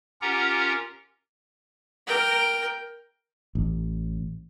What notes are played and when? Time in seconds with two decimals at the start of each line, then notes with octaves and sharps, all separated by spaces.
0.21 C#4 F4 G4 A#4 F#5 A#5
2.07 A#4 G5
3.55 A1